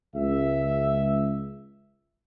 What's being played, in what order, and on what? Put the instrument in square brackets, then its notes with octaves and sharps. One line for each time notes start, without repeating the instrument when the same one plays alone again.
[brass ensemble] C#2 E5